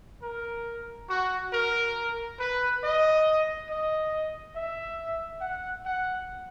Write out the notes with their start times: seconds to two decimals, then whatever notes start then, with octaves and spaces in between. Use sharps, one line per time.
0.21 A#4
1.08 F#4
1.51 A#4
2.38 B4
2.82 D#5
3.68 D#5
4.55 E5
5.41 F#5
5.85 F#5